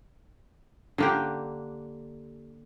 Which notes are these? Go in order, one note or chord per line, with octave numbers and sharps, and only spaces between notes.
D3 A#3 G4